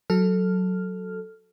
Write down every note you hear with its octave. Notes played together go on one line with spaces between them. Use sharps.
F#3 A4 F6